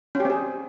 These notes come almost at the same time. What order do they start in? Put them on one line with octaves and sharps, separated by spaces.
C#4 G4 C4 G#4